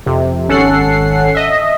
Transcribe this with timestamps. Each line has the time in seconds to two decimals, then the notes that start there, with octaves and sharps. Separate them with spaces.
0.06 F2 C3
0.48 G#1 C#4 A4 F#5 C7
1.35 D#5 E5